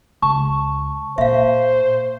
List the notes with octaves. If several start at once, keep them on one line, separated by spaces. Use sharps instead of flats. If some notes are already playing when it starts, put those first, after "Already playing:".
C#2 A5 C#6
A#2 C5 E5 F5